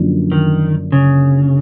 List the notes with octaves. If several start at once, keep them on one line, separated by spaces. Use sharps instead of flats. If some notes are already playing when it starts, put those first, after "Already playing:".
Already playing: F#2 D3 F3 A#3 D4
D#3
C#3